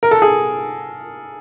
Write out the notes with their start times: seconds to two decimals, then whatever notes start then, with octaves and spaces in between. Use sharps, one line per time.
0.03 A#4
0.11 A4
0.22 G#4